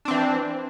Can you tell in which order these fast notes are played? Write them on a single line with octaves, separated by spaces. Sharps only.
D4 C4 E3